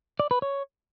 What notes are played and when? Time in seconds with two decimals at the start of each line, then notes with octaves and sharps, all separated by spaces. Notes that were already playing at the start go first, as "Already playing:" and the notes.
0.20 D5
0.31 B4
0.42 C#5